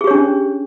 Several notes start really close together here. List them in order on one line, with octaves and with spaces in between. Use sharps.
G#4 G4 C#5 D4 C#4